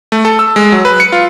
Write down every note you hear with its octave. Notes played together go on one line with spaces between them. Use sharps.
A3
A4
E6
G#3
F#3
B4
C#7
F4